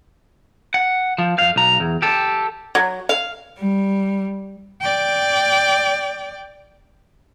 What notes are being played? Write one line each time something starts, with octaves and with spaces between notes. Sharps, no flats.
F#5
F3
F2 F5
B1 A#5
E2
G4 A4
F#3
F5
G3
D5 G5